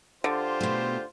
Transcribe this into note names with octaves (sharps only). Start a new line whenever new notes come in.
D3 F4 G4 C5
B2 A3